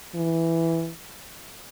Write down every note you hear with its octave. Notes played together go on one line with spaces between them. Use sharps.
E3